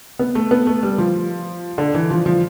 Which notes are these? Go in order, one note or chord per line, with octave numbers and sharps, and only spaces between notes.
B3
A3
B3
A3
G3
F3
D3
E3
F3
F3